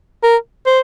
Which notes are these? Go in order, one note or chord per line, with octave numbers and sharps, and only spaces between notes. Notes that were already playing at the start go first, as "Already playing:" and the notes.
A#4
C5